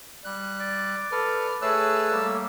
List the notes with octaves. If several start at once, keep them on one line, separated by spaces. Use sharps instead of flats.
G3 F#6
D5 D6
A4 B4 F6
A3 G#4 B4 C#5 A5 E6 F#6
G3 A#3